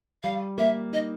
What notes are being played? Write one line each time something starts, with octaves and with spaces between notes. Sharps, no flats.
G3 F5
A#3 E5
D#4 D#5